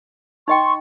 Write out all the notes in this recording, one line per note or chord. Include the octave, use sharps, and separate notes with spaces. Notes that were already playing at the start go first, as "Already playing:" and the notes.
D#4 D#5 G5 C6 C#6